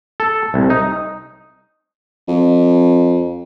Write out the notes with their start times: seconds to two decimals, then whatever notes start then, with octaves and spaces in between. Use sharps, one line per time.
0.20 A4
0.54 C2
0.70 D#4
2.28 F2